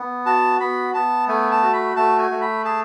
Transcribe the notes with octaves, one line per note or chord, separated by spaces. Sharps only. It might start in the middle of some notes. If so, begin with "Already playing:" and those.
Already playing: B3
F#4 A5
B3 B5
B3 A5
A3 G#5
A5
F#4
B5
A3 A5
G#5
A3
B5
G#4 A5